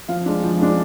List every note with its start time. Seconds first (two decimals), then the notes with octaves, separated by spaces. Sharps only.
0.08 F3 F5
0.26 G#3 D4
0.44 F3
0.60 G#3 D4